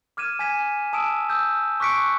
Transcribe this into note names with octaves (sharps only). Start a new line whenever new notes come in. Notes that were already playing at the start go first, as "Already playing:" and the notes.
D6 F6 G#6 D#7 E7
G#5 G#6 B6 D#7 E7
A5 D#6 E6 D7 E7
D#6 E6 G6
C#6 D6 F#6 B6 C#7 D7